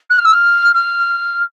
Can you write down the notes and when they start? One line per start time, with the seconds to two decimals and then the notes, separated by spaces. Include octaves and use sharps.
0.09 F#6
0.18 F6
0.24 E6
0.32 F6
0.74 F6